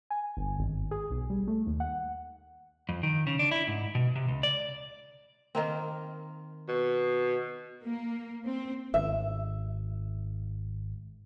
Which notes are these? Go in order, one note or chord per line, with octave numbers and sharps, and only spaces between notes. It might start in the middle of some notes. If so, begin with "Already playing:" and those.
G#5
G1
G#1
G#4
B1
G3
A3
D#2
F#5
F2
D#3
C#3
D4
E4
G#2
B2
C3
C#2
D5
D#3 A#3 C4
B2
A#3
C4
G#1 E5